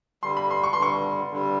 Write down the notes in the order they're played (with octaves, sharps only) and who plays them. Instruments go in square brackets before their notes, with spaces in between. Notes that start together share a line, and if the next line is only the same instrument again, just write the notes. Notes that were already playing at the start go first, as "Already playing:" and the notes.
[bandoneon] G2 D3 G3 [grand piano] C6
[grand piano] B5
C6
C#6
C6
[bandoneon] G2 D3 G3 [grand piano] C#6
[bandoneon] G2 D3 G3